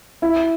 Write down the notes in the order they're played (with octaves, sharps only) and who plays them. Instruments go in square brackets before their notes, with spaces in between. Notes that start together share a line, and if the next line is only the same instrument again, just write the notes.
[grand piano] E4